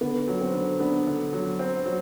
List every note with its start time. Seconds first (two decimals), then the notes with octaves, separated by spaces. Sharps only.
0.01 D3 B3
0.28 F#3
0.41 C4
0.54 D3
0.80 B3 D4
1.07 D3
1.33 F#3
1.59 C4
1.86 F#3